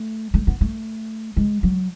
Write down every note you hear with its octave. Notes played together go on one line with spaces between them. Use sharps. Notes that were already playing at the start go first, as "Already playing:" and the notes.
Already playing: A3
A3
B3
A3
G#3
F#3